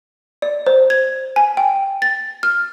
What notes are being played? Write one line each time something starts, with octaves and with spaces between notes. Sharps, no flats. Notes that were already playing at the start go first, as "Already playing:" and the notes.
D5
C5
G#6
G#5
G5
A6
F6